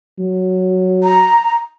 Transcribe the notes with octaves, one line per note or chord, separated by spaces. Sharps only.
F#3
A#5